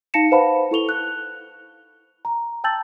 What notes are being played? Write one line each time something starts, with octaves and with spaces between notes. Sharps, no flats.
D#4 F5 A5 A#6 C#7 E7
B4 C5 F5 F#5 A5 B5
E4 A4 C#6 F7 G7
F#6
A#5
G5 A5 E6 G6 A6 F#7